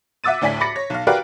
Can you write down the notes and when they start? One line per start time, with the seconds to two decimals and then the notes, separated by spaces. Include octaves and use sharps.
0.24 E5 F#5 D6 E6 A6 D#7
0.41 D2 A2 D5 G#5 B6
0.61 B5 D6 A6 A#6 C#7
0.76 C#5
0.90 B1 F5
1.07 F#4 G4 A#4 B4 D5 F5